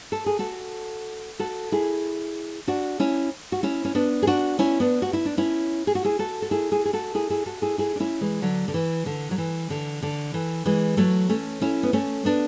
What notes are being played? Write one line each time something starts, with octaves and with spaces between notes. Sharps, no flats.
A4
G#4
F#4 A4
F#4 A4
E4 G#4
D4 F#4
C#4 E4
F#4
C#4 E4
C#4
B3 D4
G#4
D4 F#4
C#4 E4
B3 D4
F#4
E4
D4
C#4 E4
G#4
F#4
E4 G#4
F#4 A4
A4
E4 G#4
E4 G#4
G#4
F#4 A4
E4 G#4
E4 G#4
F#4 A4
E4 G#4
E4 G#4
D4
C#4 E4
E3 G#3
D3 F#3
D3
E3
D3
F#3
E3
D3
D3
E3
E3 G#3
F#3 A3
A3 C#4
C#4 E4
B3
A3 C#4
B3 D4